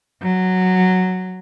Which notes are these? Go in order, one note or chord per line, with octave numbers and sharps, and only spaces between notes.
F#3